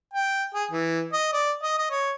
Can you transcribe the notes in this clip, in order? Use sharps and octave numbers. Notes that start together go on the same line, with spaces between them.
G5
G#4
E3
D#5
D5
D#5
D#5
C#5